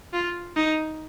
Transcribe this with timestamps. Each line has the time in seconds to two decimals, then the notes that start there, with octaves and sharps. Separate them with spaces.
0.13 F4
0.56 D#4